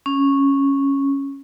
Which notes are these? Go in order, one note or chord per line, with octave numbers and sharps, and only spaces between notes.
C#4